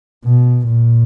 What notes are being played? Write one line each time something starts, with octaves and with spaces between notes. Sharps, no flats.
B2
A#2